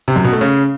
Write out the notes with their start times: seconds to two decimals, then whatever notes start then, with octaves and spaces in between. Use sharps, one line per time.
0.08 C3
0.16 F#2
0.24 B2
0.33 A3
0.41 C#3